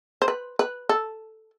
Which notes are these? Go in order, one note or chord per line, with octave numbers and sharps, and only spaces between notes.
C5
B4
B4
A4